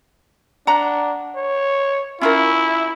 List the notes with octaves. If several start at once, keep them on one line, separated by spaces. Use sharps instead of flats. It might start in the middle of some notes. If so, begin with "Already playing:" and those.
D4 F#5 A#5
C#5
C#4 E4 F4 A#4